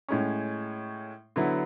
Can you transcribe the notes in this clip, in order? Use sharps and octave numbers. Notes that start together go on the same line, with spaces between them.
A2 G#3 C#4
D3 F#3 B3 E4